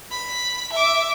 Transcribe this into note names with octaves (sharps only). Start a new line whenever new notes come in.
B5
E5 D6